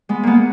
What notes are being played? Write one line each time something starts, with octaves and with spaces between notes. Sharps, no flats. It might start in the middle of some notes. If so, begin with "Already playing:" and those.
G#3 B3
G#3 A#3 B3